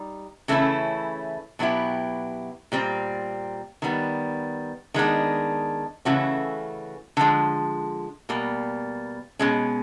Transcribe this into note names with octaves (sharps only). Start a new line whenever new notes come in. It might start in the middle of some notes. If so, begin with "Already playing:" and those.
Already playing: G3 D#4
C#3 E3 A3 C#4 E4
B2 F#3 B3 E4 G4
A#2 G3 C4
D#3 G3 B3
D#3 G#3 B3 D4
C#3 E3 A3 C#4 F#4
D3 F3 G#3
B2 G3 A#3
B2 G#3 C#4